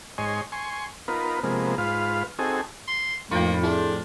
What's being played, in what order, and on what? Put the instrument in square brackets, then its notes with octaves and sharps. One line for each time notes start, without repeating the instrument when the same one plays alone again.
[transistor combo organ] G#2 C#5 D#5 G#5 C6
G#5 C6 C#6
B3 D#4 F4 A#4 B4
C3 F3 G#3 A#3 B3
G#2 F4 B4 F5
C4 D#4 F#4 G#4 A4 G#5
[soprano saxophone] C6
[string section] F2 A2 [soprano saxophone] A#3 [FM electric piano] D#4 B5 C#7 [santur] F4 G5
[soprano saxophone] D4 [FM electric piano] E4 G#4 A4